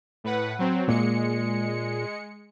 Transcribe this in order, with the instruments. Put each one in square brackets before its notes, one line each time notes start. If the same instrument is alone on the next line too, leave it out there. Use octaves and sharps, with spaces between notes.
[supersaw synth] A2 B4 F#5
F#3 C4
[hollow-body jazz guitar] A#2 [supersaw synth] G#3 C#7